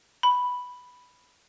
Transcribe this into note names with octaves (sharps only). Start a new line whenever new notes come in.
B5